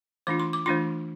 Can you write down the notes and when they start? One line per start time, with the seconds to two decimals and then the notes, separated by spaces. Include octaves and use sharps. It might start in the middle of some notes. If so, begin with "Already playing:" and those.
0.27 E3 A3 D4 F4 D6
0.40 C6
0.53 D6
0.66 E3 A3 D4 F4 C6